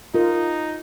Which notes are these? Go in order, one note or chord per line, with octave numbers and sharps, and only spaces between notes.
D#4 F4 A#4